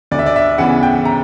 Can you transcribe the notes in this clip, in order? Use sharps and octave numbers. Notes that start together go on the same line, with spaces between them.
D2 D5
E5
D5
E5
C#3 E3 B3 E4 F#5
G5
A#5